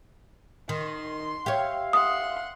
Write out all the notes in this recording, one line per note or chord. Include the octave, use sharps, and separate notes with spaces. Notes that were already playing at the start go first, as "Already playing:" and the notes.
D#3 C6
G4 C#5 E5 F5
F#5 C6 D#6